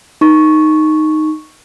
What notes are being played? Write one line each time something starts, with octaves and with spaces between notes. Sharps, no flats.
D#4 C#6